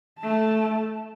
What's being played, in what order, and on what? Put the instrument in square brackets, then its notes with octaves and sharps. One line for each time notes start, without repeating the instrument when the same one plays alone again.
[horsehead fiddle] A3 A5